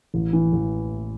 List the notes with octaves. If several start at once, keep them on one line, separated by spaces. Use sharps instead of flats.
A1
E3
A1